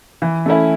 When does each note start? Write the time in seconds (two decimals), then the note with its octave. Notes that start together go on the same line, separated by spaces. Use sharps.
0.22 E3
0.46 A3 C#4 E4